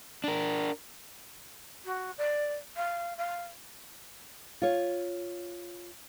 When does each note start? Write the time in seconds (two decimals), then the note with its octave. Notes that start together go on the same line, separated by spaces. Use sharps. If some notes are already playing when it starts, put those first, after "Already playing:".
0.24 D4 A#4
1.85 F#4
2.17 D5
2.76 F5
3.17 F5
4.62 F4 C#5